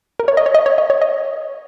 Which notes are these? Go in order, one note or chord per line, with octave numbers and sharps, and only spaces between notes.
A#4
C#5
D#5
C#5
D#5
C#5
D#5
C#5
D#5